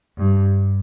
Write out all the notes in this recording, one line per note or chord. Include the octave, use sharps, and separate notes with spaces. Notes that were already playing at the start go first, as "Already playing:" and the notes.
G2